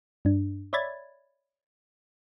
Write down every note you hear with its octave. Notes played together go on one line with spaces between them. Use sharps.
G2 D4
C#5 D5 E5 B5 G#6 A6